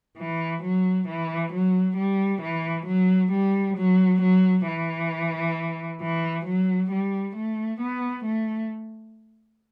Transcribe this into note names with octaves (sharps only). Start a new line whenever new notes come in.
E3
F#3
E3
F#3
G3
E3
F#3
G3
F#3
F#3
E3
E3
F#3
G3
A3
B3
A3